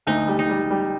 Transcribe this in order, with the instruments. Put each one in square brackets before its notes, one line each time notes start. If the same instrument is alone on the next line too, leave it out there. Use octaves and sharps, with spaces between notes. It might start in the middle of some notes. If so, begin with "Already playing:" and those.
[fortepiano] D2 [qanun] D#4
[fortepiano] G3
[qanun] D#4
[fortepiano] G3
G3